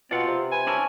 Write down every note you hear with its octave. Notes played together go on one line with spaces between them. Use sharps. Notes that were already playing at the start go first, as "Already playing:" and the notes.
B2 C4 F4 D5 F#5
C3
B4 G#5
C#4 D4 E4 A#4